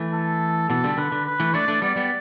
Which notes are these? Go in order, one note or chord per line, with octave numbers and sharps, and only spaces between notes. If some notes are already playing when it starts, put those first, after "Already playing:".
Already playing: E3 A3
A4
B2 E3 A4
D3 G3
D3 B4
D3
B4
E3 A3
A3 D4 D5
A3 D4
G3 B3 D5
G3 B3